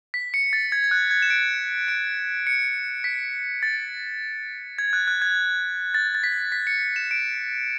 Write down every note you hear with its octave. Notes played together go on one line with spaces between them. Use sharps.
B6
C#7
A6
G#6
G#6
F#6
G#6
E7
D7
D7
C#7
B6
A6
G#6
F#6
F#6
G#6
A6
A6
B6
B6
C#7
E7
D7